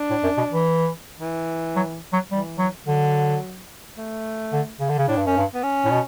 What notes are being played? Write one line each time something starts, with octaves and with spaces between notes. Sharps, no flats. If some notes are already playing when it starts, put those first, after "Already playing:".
Already playing: D4
A2
F#2
B2
E3
E3
F#3
F#3
E3 G3
F#3
D3 F#3
A3
D3
C#3
D3
C#3
A2 D4
G2
F#2 C#4
G2
B3
C#4
A2
B2